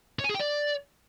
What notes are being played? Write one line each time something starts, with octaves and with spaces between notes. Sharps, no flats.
C#5
G#5
G#4
G5
D5